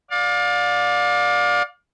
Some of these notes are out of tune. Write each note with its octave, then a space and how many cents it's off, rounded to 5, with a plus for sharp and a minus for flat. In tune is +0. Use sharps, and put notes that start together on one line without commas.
D5 +0 F5 +35